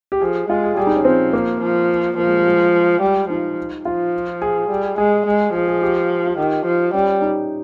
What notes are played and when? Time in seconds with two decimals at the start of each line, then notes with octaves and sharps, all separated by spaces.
0.12 G4
0.21 F3 G#4
0.49 G#3 F4
0.64 G#4
0.77 G3 G#4
0.87 D#4
0.96 C#4
1.05 F3 C4
1.33 A#3
1.61 F3
2.17 F3 A#3
2.26 G#3
2.37 G3
2.46 G#3
3.02 G3
3.29 F3 D#4
3.85 F3 F4
4.42 G#4
4.70 G3
4.98 G#3 G#4
5.26 G#3
5.54 F3 G#4
5.68 G#4
5.82 G4
6.27 F4
6.38 D#3 G4
6.66 F3
6.94 G3 C#4
7.22 D#4